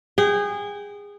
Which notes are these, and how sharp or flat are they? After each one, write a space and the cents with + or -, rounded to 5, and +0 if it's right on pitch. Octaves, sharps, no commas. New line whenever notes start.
G#4 -25 G5 -30